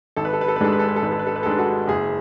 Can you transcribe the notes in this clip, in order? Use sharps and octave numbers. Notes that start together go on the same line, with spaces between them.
G#1 A4
B4
A4
B4
A4
B4
G#2 G#3 D4 A4
B4
A4
B4
A4
G#1 B4
A4
B4
A4
B4
G#2 G#3 D4 A4
B4
F#4 A4
F#1 G#4